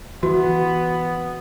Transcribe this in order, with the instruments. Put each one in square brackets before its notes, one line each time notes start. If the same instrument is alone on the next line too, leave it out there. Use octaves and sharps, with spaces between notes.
[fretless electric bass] E3 [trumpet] B3 [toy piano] F#4